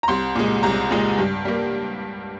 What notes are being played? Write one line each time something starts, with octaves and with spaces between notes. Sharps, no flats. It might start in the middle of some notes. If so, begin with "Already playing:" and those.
A#5
C2 C6
A#2 G#3
C2 A#5
A#2 G#3
G2
G3 A#3